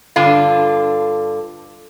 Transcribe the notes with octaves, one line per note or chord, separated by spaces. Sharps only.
G2 D3 F4